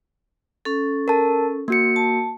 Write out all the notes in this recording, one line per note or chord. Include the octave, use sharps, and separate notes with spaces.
C#4 A4
A#4 A5
A#3 F#4 C#7
A5